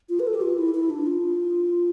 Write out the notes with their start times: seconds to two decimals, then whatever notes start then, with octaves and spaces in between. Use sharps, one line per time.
0.09 F4
0.20 B4
0.27 A4
0.34 G4
0.41 F4
0.58 E4
0.75 E4
0.90 D4
1.06 F4